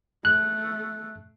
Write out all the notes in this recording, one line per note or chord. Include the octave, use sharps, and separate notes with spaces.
A3 F#6